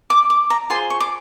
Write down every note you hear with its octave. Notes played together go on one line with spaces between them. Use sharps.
D6
D6
A#5
F4 G#4 C5 C6
C#6
D6